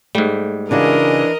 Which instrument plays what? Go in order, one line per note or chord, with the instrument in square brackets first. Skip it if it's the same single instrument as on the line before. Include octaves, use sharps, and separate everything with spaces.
[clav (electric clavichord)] G#2 G3 [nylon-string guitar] A3
[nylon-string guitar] C#3 D#4 F#4 [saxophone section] E3 D4 [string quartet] A#4 D#5